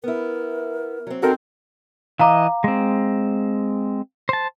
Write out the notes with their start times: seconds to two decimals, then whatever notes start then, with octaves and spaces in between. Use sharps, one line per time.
0.04 B3 E4 A#4
1.07 F#3 C4
1.23 C4 D#4 F#4 A4 A#4
2.19 E3 D#5 F5 A#5 D6
2.64 G#3 C4
4.29 C5 A5